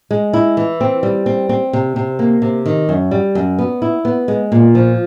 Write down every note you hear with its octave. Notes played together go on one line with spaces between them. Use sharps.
G#3
E4
E3
C4
G3
C4
C4
C3
C3
A#3
C3
D#3
F#2
G3
F#2
B3
E4
B3
G#3
A#2
F3